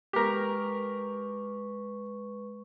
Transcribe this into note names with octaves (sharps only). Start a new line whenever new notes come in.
G#3 G4 A#4 B4 C#6